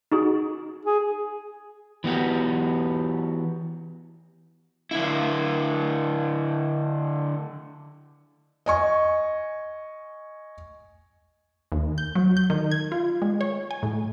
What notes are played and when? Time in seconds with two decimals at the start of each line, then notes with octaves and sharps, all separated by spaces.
0.12 D#4 F#4 G#4
0.86 G#4
2.04 E3 B3 F#4 G4
4.91 D3 E4
8.66 D#5 G#5 C#6
11.72 D#2
11.98 G6
12.15 F#3
12.37 G6
12.50 D#3
12.72 G#6
12.92 F4
13.22 G#3
13.41 C#5
13.71 G#5
13.83 A2